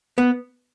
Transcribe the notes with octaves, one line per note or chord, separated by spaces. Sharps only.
B3